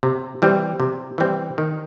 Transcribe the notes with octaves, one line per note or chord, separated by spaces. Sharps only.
C3
E3 G3 C4
C3
E3 G3 C4
D#3